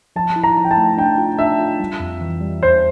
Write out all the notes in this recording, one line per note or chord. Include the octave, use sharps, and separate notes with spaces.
F3 A5
E4
A#5
F3
G5
A5
A3
D4 G5
F4
D4 E5
F4
G3
F2
E3
G3
E2 C5